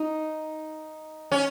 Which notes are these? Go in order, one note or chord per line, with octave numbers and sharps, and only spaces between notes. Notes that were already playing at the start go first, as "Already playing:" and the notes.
Already playing: D#4
C#4